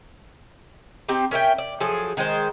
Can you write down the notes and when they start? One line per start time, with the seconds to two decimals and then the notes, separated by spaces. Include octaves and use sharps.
1.09 C4 D#4 G4
1.31 C#4 A#4 E5 G5
1.58 D5
1.80 F3 F#3 G#4 A4
2.17 D#3 G#3 G#4 C5